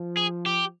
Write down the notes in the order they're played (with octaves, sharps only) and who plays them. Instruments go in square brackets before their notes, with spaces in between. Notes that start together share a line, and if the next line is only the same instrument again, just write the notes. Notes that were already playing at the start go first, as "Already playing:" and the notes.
Already playing: [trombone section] F3
[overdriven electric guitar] G#4
G4